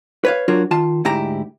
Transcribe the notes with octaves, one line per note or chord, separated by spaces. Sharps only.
B4 C#5 F5
F#3 D4 F4 F#4 A#4 C#5
D#3 F4 A5
D2 G#2 E4 G4 A#5